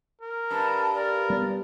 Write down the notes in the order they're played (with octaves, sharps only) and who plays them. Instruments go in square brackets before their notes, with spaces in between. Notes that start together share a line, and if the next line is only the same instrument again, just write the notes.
[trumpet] A#4
[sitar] G2 [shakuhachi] A5
[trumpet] A#4 [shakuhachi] D5
[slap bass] G3 B3